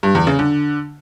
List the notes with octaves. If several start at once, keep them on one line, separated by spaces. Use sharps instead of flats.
G2
E2
C#3
D3